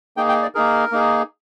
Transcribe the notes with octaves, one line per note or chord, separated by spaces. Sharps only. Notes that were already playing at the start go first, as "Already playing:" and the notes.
A#3 D#4 G#4 G5
G5
D5
A#3 D#4 G#4 A#4
A#3 D#4 G#4